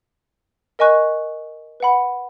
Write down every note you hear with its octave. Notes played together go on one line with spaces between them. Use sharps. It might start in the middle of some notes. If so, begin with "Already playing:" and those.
A#4 D#5 G#5 C#6 F#6
B4 F#5 B5